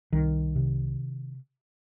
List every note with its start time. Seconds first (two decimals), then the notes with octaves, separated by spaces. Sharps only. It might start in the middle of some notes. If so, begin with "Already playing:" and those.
0.12 C2 D#3
0.56 C3